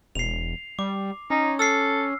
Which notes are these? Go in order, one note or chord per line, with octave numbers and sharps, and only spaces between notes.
E1 C7 F7
G3 D6
C#4 D#4
A4 E6 F6 C7